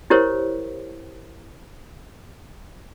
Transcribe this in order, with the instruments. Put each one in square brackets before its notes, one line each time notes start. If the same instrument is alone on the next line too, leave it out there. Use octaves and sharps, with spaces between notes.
[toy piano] E4 G4 A#4 C5 C#5